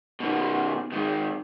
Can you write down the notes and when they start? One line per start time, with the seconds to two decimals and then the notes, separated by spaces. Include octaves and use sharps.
0.20 B2 D#3
0.92 G#2 D#3